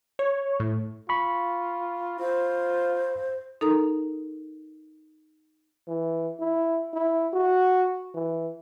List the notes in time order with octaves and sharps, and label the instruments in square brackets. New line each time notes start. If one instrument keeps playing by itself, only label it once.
[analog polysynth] C#5
A2
[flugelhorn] F4 [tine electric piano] B5 C#6
[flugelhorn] F4 [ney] C5
[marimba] D#4 A4 A#4 A#5 D#6
[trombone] E3
E4
E4
F#4
E3